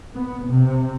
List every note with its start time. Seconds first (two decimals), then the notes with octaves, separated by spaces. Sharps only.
0.14 B3
0.47 C3